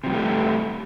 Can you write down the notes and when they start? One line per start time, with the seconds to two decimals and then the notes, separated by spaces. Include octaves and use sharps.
0.04 C3
0.06 F3
0.09 G2
0.12 G3
0.14 A3